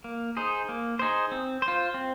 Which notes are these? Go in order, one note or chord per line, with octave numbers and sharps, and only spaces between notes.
A#3
D#4 G#4 C5
A#3
D#4 G#4 C5
C4
C5
F4
C4